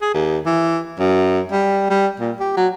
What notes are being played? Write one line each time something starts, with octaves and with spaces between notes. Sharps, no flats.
G#4
D#2
E3
F#2
G3
G3
A#2
G4
F#3